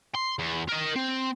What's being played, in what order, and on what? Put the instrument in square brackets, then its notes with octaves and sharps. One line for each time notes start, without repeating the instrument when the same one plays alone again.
[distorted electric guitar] C6
E2
A#4 D#5
C4